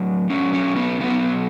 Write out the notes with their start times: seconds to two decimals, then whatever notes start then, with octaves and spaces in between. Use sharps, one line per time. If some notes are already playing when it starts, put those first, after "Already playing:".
Already playing: A2 F#3
0.30 B2 F#3 C#4
0.53 C#4
0.76 B3
1.01 B2 F#3 B3